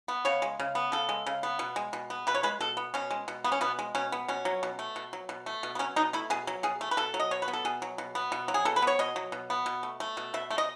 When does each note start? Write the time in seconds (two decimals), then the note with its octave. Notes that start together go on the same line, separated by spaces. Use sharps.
0.08 B3
0.25 C#3 C#5
0.42 G#3
0.60 C#3
0.75 B3
0.92 C#3 A4
1.09 G#3
1.26 C#3
1.43 B3
1.59 B2
1.76 G#3
1.93 B2
2.10 B3
2.27 B2 B4
2.35 C#5
2.43 G#3 B4
2.61 B2 A4
2.77 B3
2.94 B2 C#4
3.11 G#3
3.28 B2
3.44 B3
3.52 C#4
3.61 B2 B3
3.79 G#3
3.95 B2 C#4
4.12 B3
4.28 B2 C#4
4.45 F#3
4.63 B2
4.79 A3
4.96 B2
5.13 F#3
5.29 B2
5.46 A3
5.63 B2
5.75 B3
5.79 F#3 C#4
5.96 B2 D#4
6.13 A3 E4
6.30 B2 G#4
6.47 F#3
6.63 B2 G#4
6.81 A3
6.91 B4
6.97 B2 A4
7.14 F#3
7.20 D#5
7.31 B2 C#5
7.42 B4
7.48 B3
7.53 A4
7.65 B2 G#4
7.82 F#3
7.98 B2
8.15 B3
8.32 B2
8.48 F#3
8.54 G#4
8.65 B2 A4
8.76 B4
8.82 B3 C#5
8.99 B2 D#5
9.16 F#3
9.32 B2
9.50 B3
9.66 B2
9.83 A3
10.00 A3
10.17 B2
10.34 B2 E5
10.51 A3
10.58 D#5